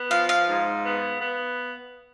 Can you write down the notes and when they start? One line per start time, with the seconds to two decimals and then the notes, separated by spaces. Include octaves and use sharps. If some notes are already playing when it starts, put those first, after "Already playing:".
Already playing: B3
0.11 F3 F5
0.29 F5
0.47 G#2
0.83 B3
1.19 B3